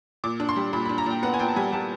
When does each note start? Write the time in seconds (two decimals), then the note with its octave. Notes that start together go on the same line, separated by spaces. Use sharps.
0.24 A#2 D6
0.40 D4
0.49 C6
0.56 G3
0.73 A#2 B5
0.86 B5
0.89 D4
0.98 A#5
1.06 A#2 G5
1.23 B3 F#5
1.34 G#5
1.39 A#2 G5
1.48 A5
1.56 G3 G#5
1.72 G3 A5